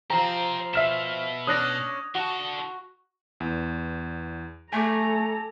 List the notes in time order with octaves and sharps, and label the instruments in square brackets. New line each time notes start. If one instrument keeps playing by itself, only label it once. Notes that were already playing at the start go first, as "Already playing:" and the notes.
[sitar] F3 C4 [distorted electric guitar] G4 C5 [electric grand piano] A#5
[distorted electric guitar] B2 [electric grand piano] E5 F6 E7
[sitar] C#4 D4 [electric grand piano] D#6 F#6 A#6
[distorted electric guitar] D3 A5 [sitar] F#4
[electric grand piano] E2
[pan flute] A3 [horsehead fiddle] A4 A#5 [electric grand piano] G#5 D6